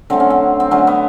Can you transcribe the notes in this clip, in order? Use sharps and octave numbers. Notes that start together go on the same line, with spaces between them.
D3 F#3 A3 C4
C#4
C4
C4
D3 F#3 A3 C#4
B3